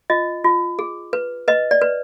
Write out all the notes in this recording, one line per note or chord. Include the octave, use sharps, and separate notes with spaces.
F4 D#5
F4
G#4
B4
B4 D#5
D5
B4